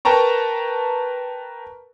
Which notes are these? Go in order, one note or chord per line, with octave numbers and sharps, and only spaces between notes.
A#4 B4 G5 A5 A#5 C#6